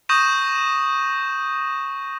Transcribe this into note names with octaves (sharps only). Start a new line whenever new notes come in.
C#6 D#6 G6 A#6 D#7 E7